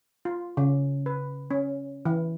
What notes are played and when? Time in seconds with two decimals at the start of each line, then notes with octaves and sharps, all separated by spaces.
0.25 F4
0.57 C#3
1.06 B4
1.51 C#4
2.05 E3